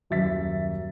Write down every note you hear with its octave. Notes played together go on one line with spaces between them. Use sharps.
D#1 F#2 E5 A6 B6